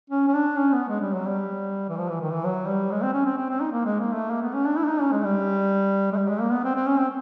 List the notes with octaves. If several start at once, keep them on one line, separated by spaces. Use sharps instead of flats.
C#4
C#4
D4
C#4
B3
G#3
G3
F#3
G3
E3
F3
E3
D#3
E3
F#3
G3
G#3
C4
C#4
C4
C4
C4
D#4
A#3
G#3
A#3
A3
A#3
B3
C#4
D4
E4
D4
D#4
C#4
G#3
G3
G#3
G3
G#3
A#3
B3
C4
C4
C#4
C4